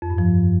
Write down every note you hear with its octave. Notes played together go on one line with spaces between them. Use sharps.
F2
G2
F3